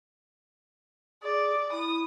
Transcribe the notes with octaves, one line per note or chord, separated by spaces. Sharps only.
G#4 D5
E4 D#6